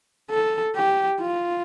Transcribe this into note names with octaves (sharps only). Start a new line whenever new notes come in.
A4
G4
F4